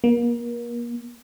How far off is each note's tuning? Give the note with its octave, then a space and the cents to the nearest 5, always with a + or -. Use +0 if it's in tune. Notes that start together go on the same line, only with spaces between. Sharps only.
A#3 +35